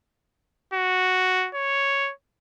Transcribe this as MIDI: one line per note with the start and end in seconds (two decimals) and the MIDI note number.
0.74 1.49 66
1.55 2.12 73